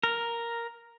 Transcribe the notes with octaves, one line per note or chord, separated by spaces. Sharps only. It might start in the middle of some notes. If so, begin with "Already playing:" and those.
A#4